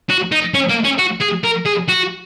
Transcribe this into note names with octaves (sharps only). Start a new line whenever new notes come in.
F#4
D#4
C#4
A#3
C#4
F#4
G#4
A#4
G#4
F#4